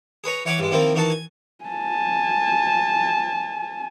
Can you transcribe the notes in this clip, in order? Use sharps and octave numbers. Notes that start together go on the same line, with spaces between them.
G#4 B4 C#5 A#5
E3 C#5 F#5 G#5 B5 D6
G2 G#3
D#3 F3 A#3 C4 E4 F4
D#3 E3 D#4 F#4 A5
G#5
G#5 A5